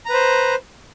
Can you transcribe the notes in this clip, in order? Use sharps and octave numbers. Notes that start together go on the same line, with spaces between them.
B4 C5 A#5